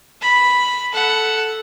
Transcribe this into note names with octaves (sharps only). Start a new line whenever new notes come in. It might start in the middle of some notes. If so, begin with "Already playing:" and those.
B5
A4 F#5